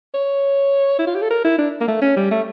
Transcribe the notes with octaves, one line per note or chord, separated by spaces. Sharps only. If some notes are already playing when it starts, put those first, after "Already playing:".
C#5
E4
F4
G4
A4
A#4
E4
D4
A#3
A3
C#4
G3
A3